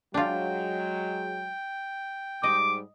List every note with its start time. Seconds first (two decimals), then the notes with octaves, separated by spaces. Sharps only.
0.14 F#3 G#3 D4 F4 G5
2.43 G#2 G3 D#5 D6